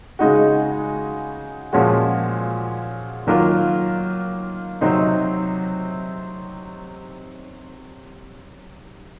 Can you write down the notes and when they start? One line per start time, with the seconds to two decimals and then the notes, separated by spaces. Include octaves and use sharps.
0.19 C#3 G#3 D#4 F#4
1.73 A#2 F3 G#3 C#4 F#4
3.27 D#3 F#3 A#3 F4 A#4
4.81 C3 F#3 C4 D#4